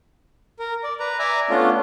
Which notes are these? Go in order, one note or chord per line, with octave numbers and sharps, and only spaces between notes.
A#4
D5
B4 A#5
D5 E5 G#5 A#5
A3 B3 C#4 D4 F4